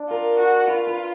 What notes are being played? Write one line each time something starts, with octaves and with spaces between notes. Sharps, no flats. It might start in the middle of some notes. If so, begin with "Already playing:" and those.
Already playing: D4
F4 A#4
F#4
F4 B4
B4